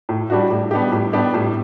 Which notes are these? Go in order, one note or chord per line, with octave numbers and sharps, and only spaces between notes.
A2
G3 D4 F#4
A2
G3 B3 D4 G4
A2
G3 B3 D4 G4
A2